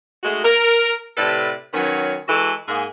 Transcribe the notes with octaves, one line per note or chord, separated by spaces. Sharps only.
G#3 A3 D#4 F#4
A#4
A2 C3 A4 B4 D5
D#3 F#3 B3 C#4 C#5
E3 G#3 F#4 A4
G#2 A#3 G#4